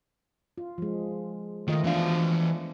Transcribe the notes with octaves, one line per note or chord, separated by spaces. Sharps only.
F4
F3 G#3
D#3 A3 F4 D#5
E3 F3 B3 D4 F5